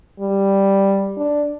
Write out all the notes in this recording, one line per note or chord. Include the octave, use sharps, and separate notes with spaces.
G3
D4